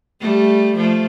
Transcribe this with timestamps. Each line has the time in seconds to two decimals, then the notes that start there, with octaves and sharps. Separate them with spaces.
0.20 G3 A3
0.76 F3 A3